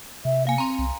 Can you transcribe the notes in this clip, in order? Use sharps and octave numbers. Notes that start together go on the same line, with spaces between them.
C3 E5
A#3 F5 G#5
C4 A#5 C6
C2